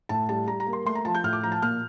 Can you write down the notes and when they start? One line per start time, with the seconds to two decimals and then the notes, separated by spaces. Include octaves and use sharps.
0.09 A2 A5
0.29 G3 A5
0.47 G3 A#5
0.60 A#5
0.66 A#3
0.73 C6
0.86 A3 C6
0.95 A#5
1.05 F3 A5
1.15 G6
1.24 A2 F6
1.33 D6
1.43 F3 A#5
1.52 A5
1.62 A#2 F6